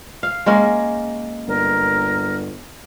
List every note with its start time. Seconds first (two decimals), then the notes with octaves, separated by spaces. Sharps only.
0.23 F5
0.46 G#3 A#3 C#4
1.48 G1 A#4